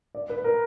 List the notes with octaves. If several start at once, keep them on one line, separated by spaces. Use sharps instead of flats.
D5
B4
A#4